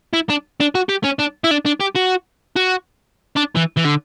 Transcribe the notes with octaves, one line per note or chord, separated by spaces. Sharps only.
E4
D4
D4
F#4
G4
C#4
D4
E4
D4
D4
G4
F#4
F#4
D4
E3
E3
D3